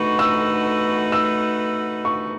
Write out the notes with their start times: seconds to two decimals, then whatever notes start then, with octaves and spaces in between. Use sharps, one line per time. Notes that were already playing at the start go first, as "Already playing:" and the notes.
Already playing: A3 D#4 F#4 B4 C#6
0.19 E6
1.12 E6
2.05 C#6